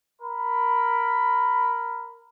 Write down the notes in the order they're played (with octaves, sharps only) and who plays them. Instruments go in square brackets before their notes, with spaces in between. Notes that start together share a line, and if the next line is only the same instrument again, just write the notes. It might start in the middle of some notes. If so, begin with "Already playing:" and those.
[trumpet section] A#4 B5